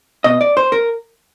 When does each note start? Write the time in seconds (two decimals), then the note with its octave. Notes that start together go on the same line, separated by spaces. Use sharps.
0.24 B2 D#5
0.41 D5
0.57 C5
0.72 A#4